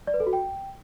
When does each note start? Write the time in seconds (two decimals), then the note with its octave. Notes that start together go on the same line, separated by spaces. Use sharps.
0.07 D5
0.14 B4
0.20 A4
0.27 F#4
0.33 G5